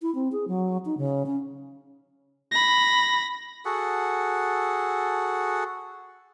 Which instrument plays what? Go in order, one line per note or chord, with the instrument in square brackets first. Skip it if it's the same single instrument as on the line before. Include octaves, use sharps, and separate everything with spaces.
[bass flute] E4
C4
G#4
F#3
D#4
C#3
C#4
[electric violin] B5 A#6
[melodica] F#4 G#4 A4 F#5